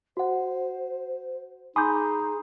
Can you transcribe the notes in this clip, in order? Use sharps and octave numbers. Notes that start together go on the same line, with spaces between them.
F#4 C5 F#5
D#4 G#4 G#5 B5 C6 D6 D#6 G6